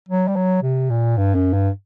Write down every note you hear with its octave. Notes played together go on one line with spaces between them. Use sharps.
F#3
G3
F#3
C3
A#2
G2
F#2
G2